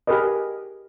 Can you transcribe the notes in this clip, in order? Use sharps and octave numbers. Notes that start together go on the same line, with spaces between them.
G4 G#4 A#4 B4 D#5